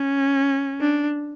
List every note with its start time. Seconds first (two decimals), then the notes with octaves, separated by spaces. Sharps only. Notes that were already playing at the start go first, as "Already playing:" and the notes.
Already playing: C#4
0.81 D4